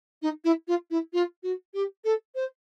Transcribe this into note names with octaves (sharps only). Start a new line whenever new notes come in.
D#4
E4
F4
E4
F4
F#4
G4
A4
C5